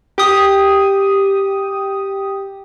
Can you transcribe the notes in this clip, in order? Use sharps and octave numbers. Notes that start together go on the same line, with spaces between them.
G4 D#6